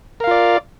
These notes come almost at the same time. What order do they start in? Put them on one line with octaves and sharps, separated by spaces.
A#4 F5 F4 D5